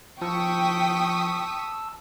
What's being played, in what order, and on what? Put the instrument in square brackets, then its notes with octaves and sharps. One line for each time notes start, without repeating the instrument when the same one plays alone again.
[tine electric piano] F3 [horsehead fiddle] G5 [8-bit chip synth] A5 E6 [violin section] C#6 D#6 B6